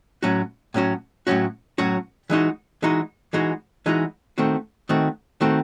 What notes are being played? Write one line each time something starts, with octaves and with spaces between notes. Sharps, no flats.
A2 F#3 C#4 F#4
A2 F#3 C#4 F#4
A2 F#3 C#4 F#4
A2 F#3 C#4 F#4
E3 G#3 D#4 F#4
E3 G#3 D#4 F#4
E3 G#3 D#4 F#4
E3 G#3 D#4 F#4
D#3 A3 C4 F#4
D#3 A3 C4 F#4
D#3 A3 C4 F#4